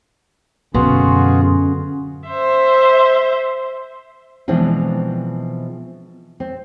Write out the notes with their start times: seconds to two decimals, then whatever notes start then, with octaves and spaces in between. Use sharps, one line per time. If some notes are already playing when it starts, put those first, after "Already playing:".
0.74 F#2 B2 D3 C#4 F4 F#4 G#4
2.28 C5 E5
4.48 B2 E3 F3 G#3 C4 D4
6.40 C4